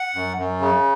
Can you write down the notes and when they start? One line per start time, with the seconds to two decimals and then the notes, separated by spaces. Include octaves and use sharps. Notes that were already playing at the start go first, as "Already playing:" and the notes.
Already playing: F#5
0.15 F#2
0.38 F#2
0.61 C#3